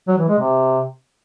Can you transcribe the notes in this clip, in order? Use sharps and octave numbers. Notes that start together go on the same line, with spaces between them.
F#3
E3
G#3
C3